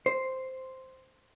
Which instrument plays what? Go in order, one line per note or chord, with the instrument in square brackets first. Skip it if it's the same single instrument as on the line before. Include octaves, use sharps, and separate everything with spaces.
[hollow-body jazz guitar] C5